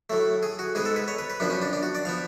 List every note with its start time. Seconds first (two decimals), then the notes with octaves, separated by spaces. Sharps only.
0.10 A2 F#3 A3
0.43 G#4
0.59 F#4
0.75 G#2 G#3 B3 G#4
0.85 A4
0.96 B4
1.08 C#5
1.19 B4
1.30 B4
1.40 F#2 F3 B3 D4
1.50 C#4
1.62 D4
1.73 D4
1.83 F#4
1.95 D5
2.05 F3 B3 F5